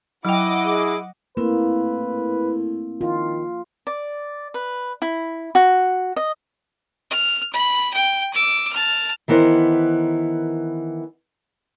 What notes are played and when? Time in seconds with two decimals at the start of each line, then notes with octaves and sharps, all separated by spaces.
0.25 F#3 E4 D#5 F#5 G5 D6
0.64 G#4
1.37 A2 A#3 C4 E4 B4
3.01 D#3 F4
3.87 D5
4.54 B4
5.02 E4
5.55 F#4
6.16 D#5
7.11 F6
7.53 B5
7.94 G5
8.33 D6 E6
8.72 A5 F6
9.28 D#3 E3 B3 A#4 C5